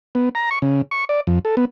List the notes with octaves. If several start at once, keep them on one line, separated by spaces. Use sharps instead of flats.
B3
A#5
C#6
C#3
C#6
D5
F2
A4
B3